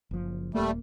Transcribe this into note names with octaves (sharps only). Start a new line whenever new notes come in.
F#1 F3
D#1 F#2 G3 A3 A#3